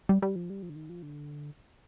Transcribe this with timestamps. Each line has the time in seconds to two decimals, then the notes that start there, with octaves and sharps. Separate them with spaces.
0.09 G3
0.22 G3
0.36 F3
0.50 G3
0.63 F3
0.70 D3
0.76 D#3
0.90 F3
1.03 D3